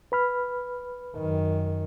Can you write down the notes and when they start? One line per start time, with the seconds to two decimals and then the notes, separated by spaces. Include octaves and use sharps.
0.12 B4 B5 F6
1.16 F#2 D#3